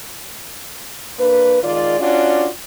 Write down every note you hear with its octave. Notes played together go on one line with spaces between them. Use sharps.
A#3 D4 B4
D#3 G#3 F4 D5
C#4 D4 F4 F#4 D5